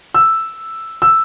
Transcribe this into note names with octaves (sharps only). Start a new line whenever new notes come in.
E6
E6